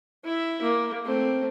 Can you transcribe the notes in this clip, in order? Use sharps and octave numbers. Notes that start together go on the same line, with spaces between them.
E4 E5
A#3
A3 C4